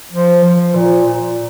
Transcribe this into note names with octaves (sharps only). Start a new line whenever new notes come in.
F3
F3
A#2
A#2